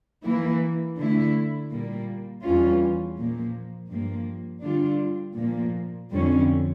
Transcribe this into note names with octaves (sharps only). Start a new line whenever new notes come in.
E3 A#3 E4
D3 A3 E4
A#2 G3 A#3
E2 E3 G3 C#4 F4
A#2 F3 A#3
G2 F3 A#3
D3 G3 D4 F4
A#2 F3 A#3
F2 D3 G3 C#4